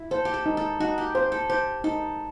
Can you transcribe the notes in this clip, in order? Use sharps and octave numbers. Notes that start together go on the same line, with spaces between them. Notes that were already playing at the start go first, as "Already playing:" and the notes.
Already playing: E4
A4 C5
G4
A4
D#4
A4
D#4 F#4
G4
G4 C5
A4
G4 C5
D#4 A4